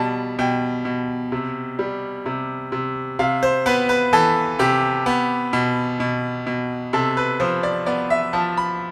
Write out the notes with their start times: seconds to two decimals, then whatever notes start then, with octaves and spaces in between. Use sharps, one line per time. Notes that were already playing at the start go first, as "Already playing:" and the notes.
Already playing: B2 G3 A5
0.39 B2 G5
0.85 B2
1.32 C3
1.79 G3
2.26 C3
2.72 C3
3.19 C3 F5
3.43 C5
3.66 B3 B4
3.89 B4
4.13 E3 A4
4.59 C3 G4
5.06 B3
5.53 B2
6.00 B2
6.47 B2
6.93 C3 A4
7.17 B4
7.40 F3 C5
7.63 D5
7.86 B3 D5
8.10 E5
8.33 F3 A5
8.57 B5